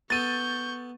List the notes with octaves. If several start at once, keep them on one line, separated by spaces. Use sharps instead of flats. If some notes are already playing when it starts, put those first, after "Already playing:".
B3 A4 C#6 G6 A6 D#7